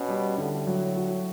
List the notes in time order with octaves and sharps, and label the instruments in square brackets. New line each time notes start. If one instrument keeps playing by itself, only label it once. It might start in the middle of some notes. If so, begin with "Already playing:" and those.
Already playing: [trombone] B2 [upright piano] C#4
[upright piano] G3
[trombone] A2 [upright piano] D3
[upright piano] F#3
F#4